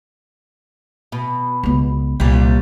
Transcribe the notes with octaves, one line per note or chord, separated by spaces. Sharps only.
B2
C#2 B3
C2 A#2 G3